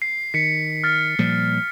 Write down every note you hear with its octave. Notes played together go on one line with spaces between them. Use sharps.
C7
D#3 B6 C#7
F6 A6
A#2 F3 G3